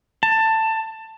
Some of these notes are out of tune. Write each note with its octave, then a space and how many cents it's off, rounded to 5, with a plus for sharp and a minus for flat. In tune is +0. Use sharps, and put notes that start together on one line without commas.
A5 +15